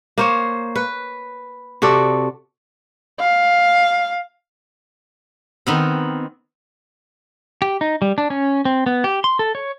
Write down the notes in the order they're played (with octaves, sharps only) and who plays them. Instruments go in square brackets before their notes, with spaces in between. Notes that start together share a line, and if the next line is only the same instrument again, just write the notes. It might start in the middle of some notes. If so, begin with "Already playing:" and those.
[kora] A#3 C5 C#5
B4
C3 F#4 A4 D5
[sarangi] F5
[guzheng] D#3 B3 C4
[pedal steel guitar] G4
D#4
G3
D4
C#4
C4
B3
G4
C6
A4
C#5